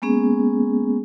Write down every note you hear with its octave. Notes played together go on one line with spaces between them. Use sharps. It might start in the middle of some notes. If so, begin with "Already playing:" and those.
G#3 A#3 B3 C#4 G#4